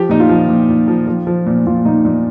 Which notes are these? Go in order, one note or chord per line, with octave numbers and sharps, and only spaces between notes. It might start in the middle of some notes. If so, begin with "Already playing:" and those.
Already playing: F3 G4
A#2 D#4
F4
F3
A#2
A#2
F3
F3
F3
A#2
A#2 F4
A#2 D#4
A#2